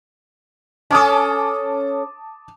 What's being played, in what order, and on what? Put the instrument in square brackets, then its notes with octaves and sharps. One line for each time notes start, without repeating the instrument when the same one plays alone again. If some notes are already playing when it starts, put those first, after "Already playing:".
[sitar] C#4 A4 [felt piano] A5 D6 D#6